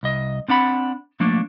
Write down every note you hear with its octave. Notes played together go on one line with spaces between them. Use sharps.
C2 D#5
C4 D4 F#5 B5
F3 A3 A#3 D4